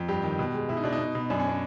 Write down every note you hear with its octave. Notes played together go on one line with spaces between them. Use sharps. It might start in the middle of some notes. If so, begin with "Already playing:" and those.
Already playing: F2
G2 G4
D#3
B2
G#3
B2 E4
D#4
B2 D4
D#4
B2
B2
F#2 D4
C#4
D4